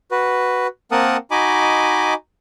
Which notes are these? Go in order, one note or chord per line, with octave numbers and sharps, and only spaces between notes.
F#4 B4
A#3 C4 A#4 F#5 A5 D#6
D#4 F#4 D#5 G#5 B5 D6